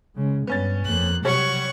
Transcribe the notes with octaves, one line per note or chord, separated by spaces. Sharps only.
C#3 G#3
G2 B3 C#4 A6
F2 A#3 F#6
C3 F#3 G3 C#5 F#5 C#6